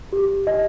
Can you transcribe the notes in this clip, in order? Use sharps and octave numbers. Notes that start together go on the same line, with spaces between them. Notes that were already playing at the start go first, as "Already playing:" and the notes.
G4
D#5